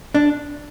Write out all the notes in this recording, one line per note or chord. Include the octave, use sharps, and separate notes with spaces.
D4